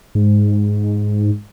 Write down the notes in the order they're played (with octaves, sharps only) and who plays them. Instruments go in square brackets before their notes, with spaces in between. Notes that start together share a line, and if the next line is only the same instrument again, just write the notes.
[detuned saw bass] G#2